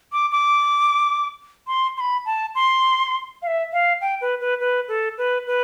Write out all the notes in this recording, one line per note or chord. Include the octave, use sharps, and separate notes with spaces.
D6
D6
C6
C6
B5
A5
C6
F5
E5
F5
G5
B4
B4
B4
A4
B4
B4